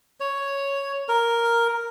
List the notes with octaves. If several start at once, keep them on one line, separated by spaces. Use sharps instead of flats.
C#5
A#4